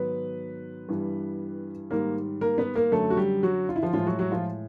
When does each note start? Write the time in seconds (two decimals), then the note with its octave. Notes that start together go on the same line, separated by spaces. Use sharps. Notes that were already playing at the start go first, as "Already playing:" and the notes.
Already playing: G#2 D#3 F#3 B3 B4
0.88 G2 E3 G3
1.90 G#2 D#3 G3 A#3 A#4
2.41 A#3 A#4
2.58 B3 B4
2.75 A#3 A#4
2.92 F#2 D3 F#3 A3 A4
3.10 F#4
3.17 G3 G4
3.43 F#3 F#4
3.69 F4
3.76 E4
3.83 F3 F4
3.93 A2 E3 F3 G#3 F4
4.07 F#3 F#4
4.19 F#3 F#4
4.32 F3 F4